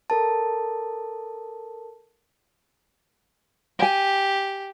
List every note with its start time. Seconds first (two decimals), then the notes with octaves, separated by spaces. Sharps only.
0.10 A4 A#4 A5
3.79 G4 G5 G#5